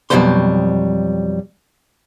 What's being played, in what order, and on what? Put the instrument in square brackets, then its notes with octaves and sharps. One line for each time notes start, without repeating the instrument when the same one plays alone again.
[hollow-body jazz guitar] F2 B2 F#3 G3 C5 C6